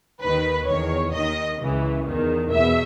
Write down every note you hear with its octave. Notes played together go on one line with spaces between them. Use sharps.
D#2 D#3 B4
E2 D#3 C#5
D#2 D#3 D#5
C#2 C#3 E3
E2 D#3
E2 B2 E5